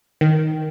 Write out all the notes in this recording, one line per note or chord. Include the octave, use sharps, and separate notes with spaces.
D#3